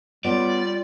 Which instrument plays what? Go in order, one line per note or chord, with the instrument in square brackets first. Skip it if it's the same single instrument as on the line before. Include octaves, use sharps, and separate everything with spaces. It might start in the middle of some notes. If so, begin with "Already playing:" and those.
[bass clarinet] G3 [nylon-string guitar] B3 C#4 A4 [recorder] F4 [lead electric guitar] D5